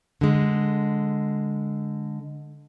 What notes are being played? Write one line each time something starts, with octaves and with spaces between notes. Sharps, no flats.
D3 G#3